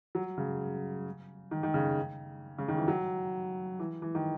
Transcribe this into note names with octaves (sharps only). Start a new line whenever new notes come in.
F#3
C#3
D#3
D#3
C#3
C#3
D#3
E3
F#3
E3
E3
D#3